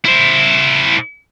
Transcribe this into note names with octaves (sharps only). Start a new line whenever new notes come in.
E4 C5